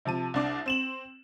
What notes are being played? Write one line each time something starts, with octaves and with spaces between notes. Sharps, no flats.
C3 F3 A5 D#7
C2 D4 D6
C4 E7 F#7